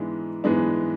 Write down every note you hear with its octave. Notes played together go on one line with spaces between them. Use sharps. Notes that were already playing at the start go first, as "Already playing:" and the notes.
Already playing: G#2 E3 G#3 B3 D4
G#2 E3 G#3 B3 D4